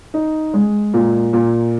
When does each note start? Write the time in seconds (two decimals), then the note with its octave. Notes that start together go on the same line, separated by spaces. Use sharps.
0.14 D#4
0.54 G#3
0.94 A#2
1.33 A#2